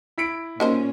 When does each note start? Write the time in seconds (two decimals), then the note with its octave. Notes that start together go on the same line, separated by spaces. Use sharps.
0.18 E4 B6 D7
0.60 A#2 C#4 D#4 A#4 C5